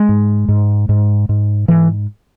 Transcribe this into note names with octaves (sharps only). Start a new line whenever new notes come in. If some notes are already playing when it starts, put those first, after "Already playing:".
Already playing: G#3
G#2
G#2
G#2
G#2
G#2 E3